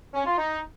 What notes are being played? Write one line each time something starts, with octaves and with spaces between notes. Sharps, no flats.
C#4
F4
D#4